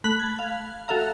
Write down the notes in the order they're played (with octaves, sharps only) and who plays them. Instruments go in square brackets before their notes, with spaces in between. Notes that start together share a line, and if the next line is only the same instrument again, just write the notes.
[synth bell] A3 B5 F#6 B6 F#7
A5 G#6
F5
F#4 A4 E5 F5 A#5